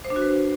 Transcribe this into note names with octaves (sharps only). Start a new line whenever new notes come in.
C5
D4
F#4
B4